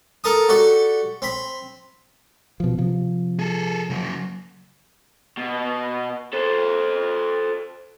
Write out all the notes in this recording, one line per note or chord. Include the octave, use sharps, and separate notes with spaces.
A4 A#4 A5 D#6
F#4 G4 A4 D5
C4 B5
B2 F3
C3 F3
G#4 A4
C#3 F#3
B2
A4 C5